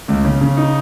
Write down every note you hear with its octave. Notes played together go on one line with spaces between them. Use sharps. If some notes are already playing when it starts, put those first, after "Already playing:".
C#2
C#3
C#3
D#4